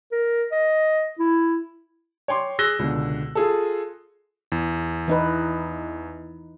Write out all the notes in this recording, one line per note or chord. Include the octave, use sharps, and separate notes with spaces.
A#4
D#5
E4
C#5 G5 C6 D6
G#4 E6 F#6 A#6 G7
C#2 B2 D3
F4 G#4 A4
E2
E3 D#4 B4